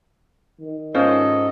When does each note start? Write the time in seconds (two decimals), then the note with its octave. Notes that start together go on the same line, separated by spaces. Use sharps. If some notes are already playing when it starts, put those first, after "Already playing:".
0.60 D#3
0.94 G#2 C#4 F4 A4 C5 D#5